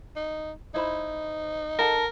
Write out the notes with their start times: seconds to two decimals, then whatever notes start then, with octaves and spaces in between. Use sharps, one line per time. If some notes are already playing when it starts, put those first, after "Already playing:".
0.16 D#4
0.74 D#4 E4 C5 B5
1.78 A4 A#4 F#5 A5